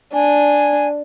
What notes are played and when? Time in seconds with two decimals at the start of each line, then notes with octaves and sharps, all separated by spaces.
0.13 D4 G#5